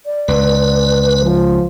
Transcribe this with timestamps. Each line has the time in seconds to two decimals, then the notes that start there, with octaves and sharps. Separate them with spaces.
0.06 D5
0.28 C#2 B4
1.23 F3